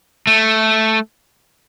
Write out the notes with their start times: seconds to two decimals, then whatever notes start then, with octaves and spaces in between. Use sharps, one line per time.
0.27 A3